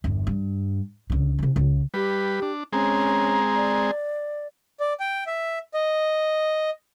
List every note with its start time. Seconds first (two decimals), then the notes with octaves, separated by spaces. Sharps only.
0.04 G1 E2
0.27 G2
1.10 C#2 D3
1.39 C3 E3
1.56 C#2 C#3
1.94 G3 G4 B4
2.42 D4
2.73 G#3 C4 C#4 G#4 A#5
3.56 D5
4.80 D5
5.00 G5
5.27 E5
5.74 D#5